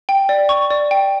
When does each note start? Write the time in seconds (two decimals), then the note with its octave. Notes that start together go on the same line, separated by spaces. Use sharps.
0.09 G5
0.29 D5
0.49 C#6
0.70 D5
0.91 G5